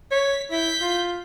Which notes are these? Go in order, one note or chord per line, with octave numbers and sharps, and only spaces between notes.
C#5 B6
E4 G6 B6
F4